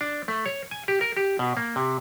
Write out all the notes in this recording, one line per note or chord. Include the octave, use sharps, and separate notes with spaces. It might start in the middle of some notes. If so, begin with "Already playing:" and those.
D4
A3
C#5
G#5
G4
A#4
G4
B2
A#3
C3